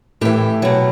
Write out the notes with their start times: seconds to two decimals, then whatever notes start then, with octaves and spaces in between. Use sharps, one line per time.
0.21 A2 E3 G4
0.62 B2 F#3